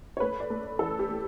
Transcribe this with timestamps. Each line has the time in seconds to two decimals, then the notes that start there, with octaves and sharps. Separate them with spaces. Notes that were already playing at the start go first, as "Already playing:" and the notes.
0.17 C#5
0.20 A3 B4
0.40 D5
0.50 A3
0.79 E3 A4
0.99 G4
1.09 A3